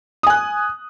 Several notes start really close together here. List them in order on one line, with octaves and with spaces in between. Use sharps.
D#6 G#5 F#6